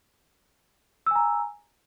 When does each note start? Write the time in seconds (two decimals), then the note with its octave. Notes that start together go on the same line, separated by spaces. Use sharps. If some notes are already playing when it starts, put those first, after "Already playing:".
1.06 E6
1.11 G#5
1.15 A#5